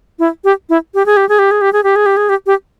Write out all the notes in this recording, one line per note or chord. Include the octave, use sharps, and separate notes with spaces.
E4
G4
E4
G4
G#4
G4
G#4
G4
G#4
G4
G#4
G4
G#4
G4
G#4
G4
G4